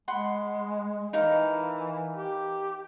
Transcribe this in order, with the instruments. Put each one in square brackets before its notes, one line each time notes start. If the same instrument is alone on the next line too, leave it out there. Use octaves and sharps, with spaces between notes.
[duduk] G#3 [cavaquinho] F#5 B5 C6
[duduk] E3 [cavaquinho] D#4 A#4 F5
[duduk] G4